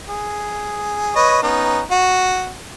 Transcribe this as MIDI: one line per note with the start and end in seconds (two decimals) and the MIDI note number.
0.08 1.11 68
1.16 1.41 71
1.16 1.41 73
1.16 1.41 75
1.43 1.81 59
1.43 1.81 61
1.43 1.81 63
1.91 2.50 66